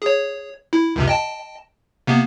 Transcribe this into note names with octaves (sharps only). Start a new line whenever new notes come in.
G#4 C#5
E4
C#2 F#2 C3
D#5 G5 A5
C3 A#3 B3